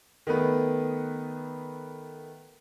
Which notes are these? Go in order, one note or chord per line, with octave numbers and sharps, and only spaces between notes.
D#3 A3 B3 B4